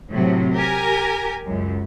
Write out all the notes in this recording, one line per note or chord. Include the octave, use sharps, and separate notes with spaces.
A2 C3 F#3
G4 A#4 G#5
C#2 F#2